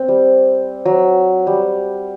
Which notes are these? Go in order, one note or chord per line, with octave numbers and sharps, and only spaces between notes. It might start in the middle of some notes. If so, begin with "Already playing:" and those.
Already playing: C4
G3
F#3
G3